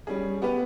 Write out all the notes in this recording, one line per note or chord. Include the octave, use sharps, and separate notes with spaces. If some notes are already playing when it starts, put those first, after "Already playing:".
G3 C#4 G#4
B3 G4 B4